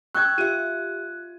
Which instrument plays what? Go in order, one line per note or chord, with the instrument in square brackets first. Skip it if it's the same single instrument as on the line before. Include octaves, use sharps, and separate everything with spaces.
[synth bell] G5 C#6 [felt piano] E6 G#6 [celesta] F#6
[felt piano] F4 D#7 [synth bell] G4 E5